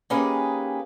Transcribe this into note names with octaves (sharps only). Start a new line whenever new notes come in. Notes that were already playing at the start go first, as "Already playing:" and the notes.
A#3 C#4 D#4 G4 G#4 B4